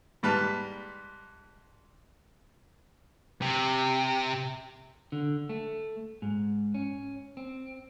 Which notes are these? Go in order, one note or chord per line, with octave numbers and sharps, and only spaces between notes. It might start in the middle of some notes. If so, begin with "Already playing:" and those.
G#2 G3 B4 A5 F6
C3
D3
A3
G#2
C#4
C4